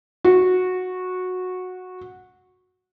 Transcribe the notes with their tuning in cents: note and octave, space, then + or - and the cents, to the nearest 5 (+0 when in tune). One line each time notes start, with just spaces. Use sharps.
F#4 -15